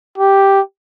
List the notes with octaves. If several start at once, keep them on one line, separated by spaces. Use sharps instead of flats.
G4